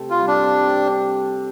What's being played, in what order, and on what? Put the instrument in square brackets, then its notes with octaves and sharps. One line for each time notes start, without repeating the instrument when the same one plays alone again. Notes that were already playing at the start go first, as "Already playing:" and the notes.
Already playing: [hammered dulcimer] C3 A3 C4 A4
[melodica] F4
[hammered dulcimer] G3
[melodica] D4
[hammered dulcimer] C4
C4